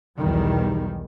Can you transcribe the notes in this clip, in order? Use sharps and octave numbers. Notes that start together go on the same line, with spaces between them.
B1 E2 D#3 G3